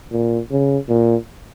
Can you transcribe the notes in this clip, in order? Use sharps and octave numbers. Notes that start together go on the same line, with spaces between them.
A#2
C#3
A#2